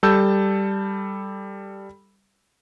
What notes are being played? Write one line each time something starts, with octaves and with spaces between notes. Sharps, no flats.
G3 A4 A5 E6 G6